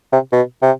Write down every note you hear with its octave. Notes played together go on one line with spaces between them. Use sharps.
C3
B2
C3